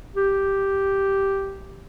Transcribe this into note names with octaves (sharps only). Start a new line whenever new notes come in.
G4